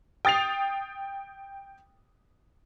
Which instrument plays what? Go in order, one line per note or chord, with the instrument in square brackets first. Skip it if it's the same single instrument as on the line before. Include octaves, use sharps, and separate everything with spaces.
[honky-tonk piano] G5 D#6 A6 C7 F7